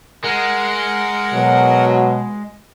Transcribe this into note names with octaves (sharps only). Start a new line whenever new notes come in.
G#3 A#4 F#5
B2 F#3